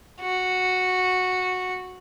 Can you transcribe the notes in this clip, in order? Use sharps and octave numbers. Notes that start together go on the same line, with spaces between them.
F#4